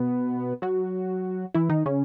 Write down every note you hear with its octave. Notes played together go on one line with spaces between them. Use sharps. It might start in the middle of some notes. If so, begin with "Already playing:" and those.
Already playing: B2 B3
F#3 F#4
E3 E4
D#3 D#4
C#3 C#4